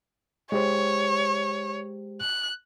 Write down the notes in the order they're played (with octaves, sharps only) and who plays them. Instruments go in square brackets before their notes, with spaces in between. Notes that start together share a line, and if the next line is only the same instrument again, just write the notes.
[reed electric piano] G#3 G4 C5 [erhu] C#5
[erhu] F#6